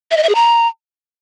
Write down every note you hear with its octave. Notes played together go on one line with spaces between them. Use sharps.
E5
D#5
E5
G#4
A#5